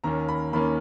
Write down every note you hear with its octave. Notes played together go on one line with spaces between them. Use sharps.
D#2 D#3 A#3 C#4 A#5
B5
D#2 D#3 A#3 C#4 B5